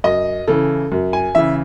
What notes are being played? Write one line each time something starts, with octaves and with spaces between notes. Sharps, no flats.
F#2 D#5
C#3 E3 A4
F#2
G#5
C#3 E3 E5